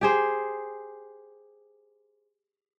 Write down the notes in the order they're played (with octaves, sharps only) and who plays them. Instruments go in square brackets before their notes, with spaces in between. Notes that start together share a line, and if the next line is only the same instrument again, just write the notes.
[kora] G4 G#4 C5